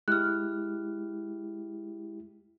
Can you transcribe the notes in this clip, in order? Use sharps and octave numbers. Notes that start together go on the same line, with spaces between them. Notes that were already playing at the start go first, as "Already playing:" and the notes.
G#3 E4 G4 F6 F#6